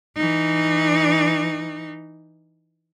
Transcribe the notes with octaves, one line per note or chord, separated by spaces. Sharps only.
E3 D#4